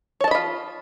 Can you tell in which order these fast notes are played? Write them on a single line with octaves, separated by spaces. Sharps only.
C#5 A5 D#5 B5 F4